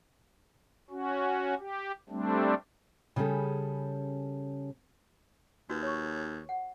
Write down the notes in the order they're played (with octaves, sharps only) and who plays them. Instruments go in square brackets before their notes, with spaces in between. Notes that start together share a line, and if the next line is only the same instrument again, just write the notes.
[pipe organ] C#4 F#4
G4
G3 A3 C4 D4
[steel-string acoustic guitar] C#3 G3 C#4 G#4 A4
[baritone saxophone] D#2 [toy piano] F#4 B4
[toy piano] C#5 C#6
F#5